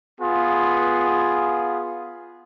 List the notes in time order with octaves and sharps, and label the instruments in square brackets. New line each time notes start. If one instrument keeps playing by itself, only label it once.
[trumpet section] B3 F4 G#4